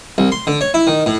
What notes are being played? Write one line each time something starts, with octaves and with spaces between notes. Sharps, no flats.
C2
C6
D3
C#5
E4
D#3
A2